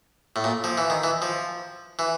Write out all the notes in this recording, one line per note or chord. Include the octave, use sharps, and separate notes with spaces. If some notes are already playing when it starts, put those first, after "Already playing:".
A2
A#2
F3
E3
D#3
E3
F3
E3